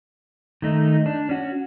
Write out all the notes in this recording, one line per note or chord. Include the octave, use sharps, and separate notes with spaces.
D#3 A3 D#4
D4
C#4 F#4